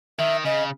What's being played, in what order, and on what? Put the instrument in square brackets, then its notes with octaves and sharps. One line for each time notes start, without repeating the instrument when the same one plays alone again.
[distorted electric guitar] D#3 [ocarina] E5
[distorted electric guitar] C#3 [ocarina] D#5